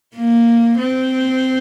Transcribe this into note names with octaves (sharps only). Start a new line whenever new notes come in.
A#3
C4